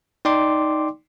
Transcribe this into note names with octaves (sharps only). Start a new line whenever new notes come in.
D#4 D5 G5 C6 D6